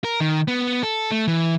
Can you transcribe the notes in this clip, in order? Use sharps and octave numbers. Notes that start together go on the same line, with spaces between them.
A#4
D#3
B3
A4
A3
E3